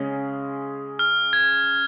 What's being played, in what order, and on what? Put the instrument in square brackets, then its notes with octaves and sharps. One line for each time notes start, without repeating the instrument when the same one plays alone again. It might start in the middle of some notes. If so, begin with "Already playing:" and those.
Already playing: [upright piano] C#3 G#3 C#4 G#4
[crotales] F6
G#6